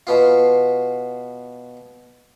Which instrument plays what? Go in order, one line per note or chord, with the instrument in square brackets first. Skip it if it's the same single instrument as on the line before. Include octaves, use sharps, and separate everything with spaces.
[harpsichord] B2 B3 F4